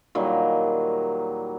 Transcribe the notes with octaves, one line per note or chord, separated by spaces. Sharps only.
A#2 D#3 F#3 G3